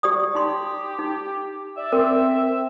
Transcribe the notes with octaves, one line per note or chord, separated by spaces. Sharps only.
G4 D5 D#6
D#4 G4 C6
D#4
D5 E5
C4 A#4